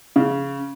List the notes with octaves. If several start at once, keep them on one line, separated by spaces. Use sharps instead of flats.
C#3